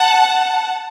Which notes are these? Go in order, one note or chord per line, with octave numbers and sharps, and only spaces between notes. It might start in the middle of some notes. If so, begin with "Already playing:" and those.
Already playing: F#5 A5